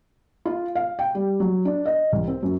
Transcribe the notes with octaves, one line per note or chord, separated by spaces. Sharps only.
F4
F5
G5
G3
F#3
D4
D#5
C2
C4
F#2